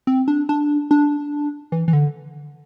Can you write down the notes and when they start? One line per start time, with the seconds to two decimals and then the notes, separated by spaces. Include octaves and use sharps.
0.07 C4
0.28 D4
0.49 D4
0.91 D4
1.72 E3
1.88 E3
1.93 D3